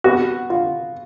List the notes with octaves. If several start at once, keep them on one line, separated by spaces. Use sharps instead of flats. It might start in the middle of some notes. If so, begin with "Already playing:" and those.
B3 F#4
F4